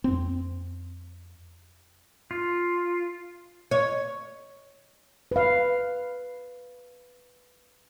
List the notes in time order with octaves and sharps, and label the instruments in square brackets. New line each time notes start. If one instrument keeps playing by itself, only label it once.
[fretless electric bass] F2 C4
[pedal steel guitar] F4
[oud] C#5
[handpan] B4 F5